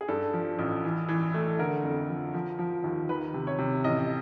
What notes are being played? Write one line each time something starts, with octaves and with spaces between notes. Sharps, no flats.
G#4
G2 A4
F3
A1
E3
E3
A3
D3 A#4
F2
F3
F3
F3
D#2
D#3 B4
C3
C#5
C3
A1 D#5